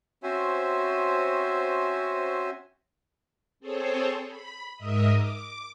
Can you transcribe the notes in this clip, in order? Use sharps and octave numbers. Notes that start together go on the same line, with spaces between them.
C4 C#4 F#4 C5 E5 G#5
C4 G#4 A4 C5 C#5
B5
G#2 A#4 D#5 E5 D#6
D6